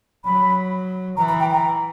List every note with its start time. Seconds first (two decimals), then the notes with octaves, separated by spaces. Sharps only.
0.25 F#3 B5
1.17 E3 A#5
1.29 A#5
1.40 G5
1.51 A#5